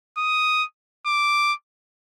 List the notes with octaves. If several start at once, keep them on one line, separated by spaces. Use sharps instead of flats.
D#6
D6